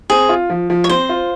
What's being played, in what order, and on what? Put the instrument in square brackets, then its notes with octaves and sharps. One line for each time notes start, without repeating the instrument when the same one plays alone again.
[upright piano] C4 [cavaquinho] G#4
[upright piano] F4
F3
F3
[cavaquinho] C#5
[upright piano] C4 [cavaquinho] C5
[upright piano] F4